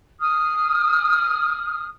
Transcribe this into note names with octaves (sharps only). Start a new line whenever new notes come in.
D#6 F6